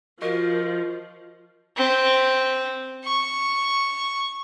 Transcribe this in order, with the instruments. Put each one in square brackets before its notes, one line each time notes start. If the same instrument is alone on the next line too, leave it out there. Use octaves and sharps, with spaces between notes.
[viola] F3 [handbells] F4 F#4 D#5 [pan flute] A#4
[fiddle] C4
C#6